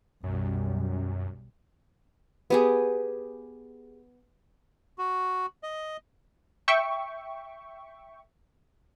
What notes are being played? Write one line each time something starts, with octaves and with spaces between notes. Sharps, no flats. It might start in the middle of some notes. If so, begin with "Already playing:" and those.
B1 F#2 G3
B3 G4 G#4
F#4
D#5
E5 G5 C#6